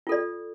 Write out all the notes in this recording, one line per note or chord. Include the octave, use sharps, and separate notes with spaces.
F4 A4 D5